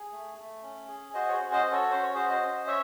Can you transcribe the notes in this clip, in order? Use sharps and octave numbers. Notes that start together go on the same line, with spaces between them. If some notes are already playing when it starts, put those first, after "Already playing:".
Already playing: G#4
A3
A3
C#4
G#4
F#4 C5 D#5
C#5
G#4 C5
C#4
C5 D#5
F#4
A4 C#5
C#4 C5
C#5
F#4 G#4 C5
C5 D#5
C#4
C#5 E5